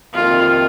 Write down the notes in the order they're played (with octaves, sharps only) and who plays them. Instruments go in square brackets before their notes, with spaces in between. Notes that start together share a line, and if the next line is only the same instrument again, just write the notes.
[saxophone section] F2 C3 D#3 A#3 [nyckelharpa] F4